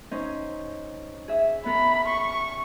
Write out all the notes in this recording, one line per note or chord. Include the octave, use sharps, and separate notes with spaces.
C#4 D#4 C5
G#4 E5
B3 A#4 B5
C#6